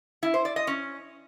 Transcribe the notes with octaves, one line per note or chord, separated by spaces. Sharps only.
E4
C5
D5
D#5
C#4